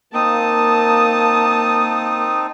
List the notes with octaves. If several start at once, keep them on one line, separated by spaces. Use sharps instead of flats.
A#3 C4 D#4 A5 D#6